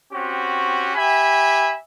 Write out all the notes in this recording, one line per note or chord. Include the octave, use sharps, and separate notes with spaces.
C4 C#4 F#4 G4
G4 E5 G#5 B5